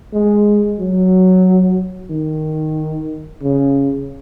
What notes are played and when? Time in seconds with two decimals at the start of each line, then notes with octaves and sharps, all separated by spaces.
0.13 G#3
0.79 F#3
2.10 D#3
3.42 C#3